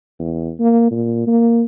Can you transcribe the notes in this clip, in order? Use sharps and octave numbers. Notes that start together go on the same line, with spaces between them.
E2
A#3
A#2
A#3